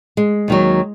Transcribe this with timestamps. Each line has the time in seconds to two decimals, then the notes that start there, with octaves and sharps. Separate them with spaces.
0.17 G#3
0.48 D#2 D#3 F#3